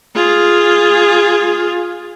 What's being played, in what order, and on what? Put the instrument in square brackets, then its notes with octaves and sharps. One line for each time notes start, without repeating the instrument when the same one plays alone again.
[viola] F4 G#4